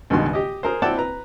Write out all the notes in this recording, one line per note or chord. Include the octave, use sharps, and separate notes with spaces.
C#2 G2 B2 D#3 G#3 C6
G4 D#5
G#4 A#4 C5
C4 E4 D5 F#5 G5 A5
B4 A#5